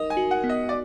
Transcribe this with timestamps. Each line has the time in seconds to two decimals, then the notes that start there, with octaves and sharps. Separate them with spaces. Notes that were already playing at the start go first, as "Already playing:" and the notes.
Already playing: D#4 A#4 D#5
0.10 G#5
0.17 F#4
0.31 F#5
0.44 B3
0.49 D#5
0.69 D5